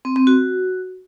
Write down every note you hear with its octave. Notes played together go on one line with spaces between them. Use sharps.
C4
C4
F#4